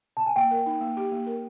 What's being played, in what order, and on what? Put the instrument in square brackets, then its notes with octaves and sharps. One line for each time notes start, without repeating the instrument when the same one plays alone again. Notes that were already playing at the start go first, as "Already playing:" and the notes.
[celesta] A5
G#5
[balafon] A#3 [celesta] G5
[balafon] A#4
D#4
A#3
G4
A#3
A#4